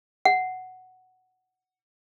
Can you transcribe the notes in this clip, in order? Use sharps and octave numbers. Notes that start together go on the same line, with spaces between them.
F#5